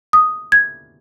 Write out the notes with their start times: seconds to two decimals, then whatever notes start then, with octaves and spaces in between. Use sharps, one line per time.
0.13 D#6
0.52 G#6